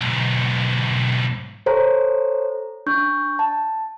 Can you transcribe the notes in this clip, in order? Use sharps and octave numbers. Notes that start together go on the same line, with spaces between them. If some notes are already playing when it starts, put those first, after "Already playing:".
B1 G#2
A4 C5 C#5 A#5
D4 C#6 G6
A5